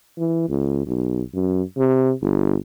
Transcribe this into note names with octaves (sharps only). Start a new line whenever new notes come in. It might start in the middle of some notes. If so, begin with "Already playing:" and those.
E3
C#2
B1
F#2
C3
G1